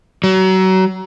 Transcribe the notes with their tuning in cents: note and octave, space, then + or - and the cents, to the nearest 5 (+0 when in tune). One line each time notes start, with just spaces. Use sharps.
F#3 +30